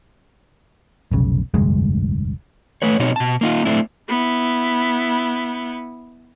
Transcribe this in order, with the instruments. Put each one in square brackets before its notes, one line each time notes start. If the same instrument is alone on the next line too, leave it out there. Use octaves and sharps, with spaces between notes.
[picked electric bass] F1 B1 C#3
F1 D2 G2 G#3
[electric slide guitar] A3 B4 C#5
B2 C4 D#4 C#5
B2 A5
A#3 D#4 F4
A3 C4 D4 E4
[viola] B3 E4